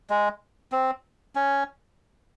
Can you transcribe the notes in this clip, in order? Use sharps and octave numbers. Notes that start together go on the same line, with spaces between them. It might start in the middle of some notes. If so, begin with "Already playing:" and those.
G#3
C4
C#4